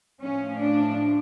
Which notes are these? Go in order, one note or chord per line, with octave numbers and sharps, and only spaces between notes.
A2 F3 C#4
D4